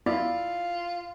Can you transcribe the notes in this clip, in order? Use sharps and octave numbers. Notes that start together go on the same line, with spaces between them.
F#2 B3 E4 F4 D5